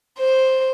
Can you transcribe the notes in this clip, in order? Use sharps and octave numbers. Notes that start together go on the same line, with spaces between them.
C5